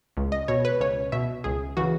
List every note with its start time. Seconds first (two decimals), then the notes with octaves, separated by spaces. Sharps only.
0.17 C#2
0.32 D#5
0.48 B2 C#5
0.65 B4
0.80 C#2 C#5
1.12 B2 E5
1.44 C#2 G#4
1.77 C#3 E3 F#4